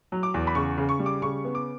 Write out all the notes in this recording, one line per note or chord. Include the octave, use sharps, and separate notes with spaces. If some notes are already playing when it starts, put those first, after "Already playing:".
F#3
D6
E2
B5
C#3 C#6
C#3
C#6
G3
D6
C#3 C#6
B3
D6